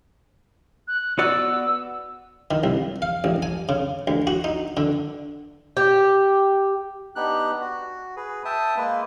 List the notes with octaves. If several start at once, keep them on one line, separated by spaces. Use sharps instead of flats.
F#6
B3 F#4 D5 E6
D#3
C2
F5
A1
G#5
C#3
D2
F#4
D#4
D3
G4
B3 D4 D#4 G4 F#6
F#4
G#4 B4
E5 G5 A5 D#6
G#3 A#3 B4